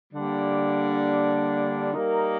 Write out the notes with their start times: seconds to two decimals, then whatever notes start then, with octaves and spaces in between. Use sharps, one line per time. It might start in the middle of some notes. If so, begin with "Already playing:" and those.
0.12 D3 G3 A#3 D4
1.94 G3 A#3 D#4 A#4